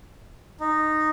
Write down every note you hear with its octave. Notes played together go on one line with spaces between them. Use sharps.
D#4